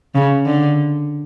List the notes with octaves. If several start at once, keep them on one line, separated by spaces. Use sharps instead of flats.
C#3
D3